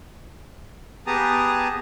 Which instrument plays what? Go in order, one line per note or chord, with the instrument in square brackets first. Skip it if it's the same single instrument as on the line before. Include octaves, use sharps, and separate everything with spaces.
[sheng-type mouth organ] B3 G4 G#4 A5 A#5 D#6